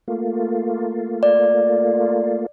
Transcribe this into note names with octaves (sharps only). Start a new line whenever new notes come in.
A3 A#3 F4
D5